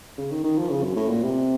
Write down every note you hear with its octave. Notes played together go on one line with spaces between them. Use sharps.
C#3
D#3
D#3
F3
C#3
F#2
A2
A#2
C3